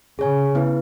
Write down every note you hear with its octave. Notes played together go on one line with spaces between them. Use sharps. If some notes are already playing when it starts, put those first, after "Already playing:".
C#3 G#4 C#5 G#5
B3 E4 B4